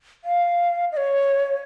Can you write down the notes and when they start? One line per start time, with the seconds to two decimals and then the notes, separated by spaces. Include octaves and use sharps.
0.24 F5
0.92 D#5
0.97 C#5